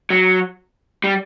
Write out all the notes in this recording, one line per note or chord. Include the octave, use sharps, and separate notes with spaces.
F#3
G3